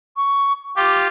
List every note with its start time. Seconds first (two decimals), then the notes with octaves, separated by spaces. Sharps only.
0.17 C#6
0.76 F4 G4 D6